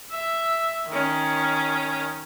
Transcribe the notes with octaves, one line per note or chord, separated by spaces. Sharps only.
E5
D#3 C#4